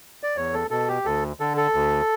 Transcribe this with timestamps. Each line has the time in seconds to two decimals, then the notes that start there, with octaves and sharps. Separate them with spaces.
0.23 D5
0.37 E2 C#5
0.54 A4
0.71 B2 A4
0.89 G4
1.05 D2 A4
1.40 D3 A4
1.57 A4
1.74 D2